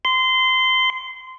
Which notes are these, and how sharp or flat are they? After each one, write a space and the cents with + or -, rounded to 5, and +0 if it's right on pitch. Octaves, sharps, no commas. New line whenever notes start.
C6 -20